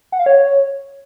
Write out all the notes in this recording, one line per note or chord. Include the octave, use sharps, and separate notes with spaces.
F#5
F5
C#5